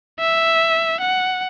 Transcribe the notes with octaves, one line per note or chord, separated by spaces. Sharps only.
E5
F#5